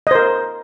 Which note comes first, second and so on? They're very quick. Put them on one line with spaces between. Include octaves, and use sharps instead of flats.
D#5 C5 A#4